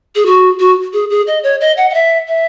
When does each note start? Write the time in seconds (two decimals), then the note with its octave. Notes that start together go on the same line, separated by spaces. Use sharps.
0.15 G#4
0.26 F#4
0.59 F#4
0.93 G#4
1.10 G#4
1.27 D#5
1.43 C#5
1.61 D#5
1.77 F#5
1.90 F#5
1.94 E5
2.28 E5